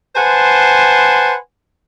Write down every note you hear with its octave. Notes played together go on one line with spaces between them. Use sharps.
B4 C5 F#5 G#5 A5 C6